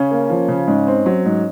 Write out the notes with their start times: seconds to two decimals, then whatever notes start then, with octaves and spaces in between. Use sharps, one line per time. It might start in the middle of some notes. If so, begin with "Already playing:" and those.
Already playing: C#3 C#4
0.11 A#3
0.30 F3
0.48 C#3
0.67 G#2 C#4
0.87 C4
1.06 F#3
1.25 G#2